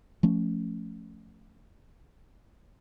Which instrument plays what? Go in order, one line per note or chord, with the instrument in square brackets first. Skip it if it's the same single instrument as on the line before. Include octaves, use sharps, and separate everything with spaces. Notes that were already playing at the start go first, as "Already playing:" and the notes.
[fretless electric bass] F3 A3 C#4